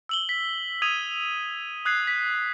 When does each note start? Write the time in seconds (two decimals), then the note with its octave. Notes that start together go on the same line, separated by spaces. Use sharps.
0.09 E6 F#7 G7
0.29 B6
0.82 D#6 G#6 D#7 F7
1.85 D#6 F#6 G#6 C7
2.07 B6